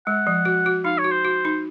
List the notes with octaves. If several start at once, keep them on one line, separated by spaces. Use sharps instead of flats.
G#3 F#5
F3
F#4
F#4
D#4 F5
C#5
F#4
C5
F#4
D#4